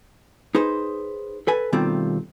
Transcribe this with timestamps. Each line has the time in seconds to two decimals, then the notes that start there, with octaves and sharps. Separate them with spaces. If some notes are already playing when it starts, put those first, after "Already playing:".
0.55 D#4 G#4 B4 C5
1.47 A4 B4 G#5
1.73 B2 D#3 G3 A3 C4 F4